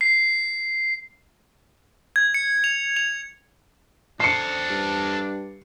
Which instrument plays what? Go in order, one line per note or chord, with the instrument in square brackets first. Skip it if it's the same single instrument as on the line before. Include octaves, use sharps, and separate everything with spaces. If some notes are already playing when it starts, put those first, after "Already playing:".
[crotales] C7
G#6
C#7
F7
F7
[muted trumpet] D4 [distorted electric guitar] A4 C5 [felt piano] C7 C#7
[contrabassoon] G2